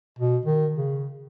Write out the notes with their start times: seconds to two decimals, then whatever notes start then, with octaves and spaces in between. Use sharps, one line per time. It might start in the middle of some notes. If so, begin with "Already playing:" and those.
0.19 B2
0.46 D#3
0.77 C#3